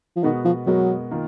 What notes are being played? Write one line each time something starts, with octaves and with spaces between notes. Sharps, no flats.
F3
B2 D#3 G#3 B3 F#4 A#4
F3
B2 F#3 G#3 B3 F#4 A#4
D#3 A#3 F4